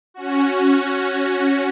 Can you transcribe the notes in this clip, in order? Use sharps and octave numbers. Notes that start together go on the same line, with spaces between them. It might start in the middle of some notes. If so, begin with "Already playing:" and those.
C#4 F#4